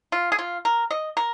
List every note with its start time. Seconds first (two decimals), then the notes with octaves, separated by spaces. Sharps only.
0.12 F4
0.32 G#4
0.39 F4
0.65 A#4
0.91 D#5
1.17 A#4